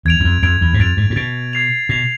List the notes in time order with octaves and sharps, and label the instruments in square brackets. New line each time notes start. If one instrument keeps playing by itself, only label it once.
[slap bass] E2 [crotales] G#6 D7 F7
[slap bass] E2
F2
[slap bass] F2 [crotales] G#6 D7 F7
[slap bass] E2
G#2
[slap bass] F2 [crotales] A6 D7 F7
[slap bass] G#2
A2
[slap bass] B2 [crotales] A6 D7 F7
[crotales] G#6 C7 F7
[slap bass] B2 [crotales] G#6 C7 F7